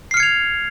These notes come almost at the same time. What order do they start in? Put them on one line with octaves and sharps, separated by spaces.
C7 F6 C#7 G#6 F7